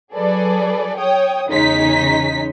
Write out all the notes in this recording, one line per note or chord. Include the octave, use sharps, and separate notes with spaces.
F#3 G#4 A4 B4 D5
C#5 G5 D#6
E2 C#3 G#3 D#4 C#5 B6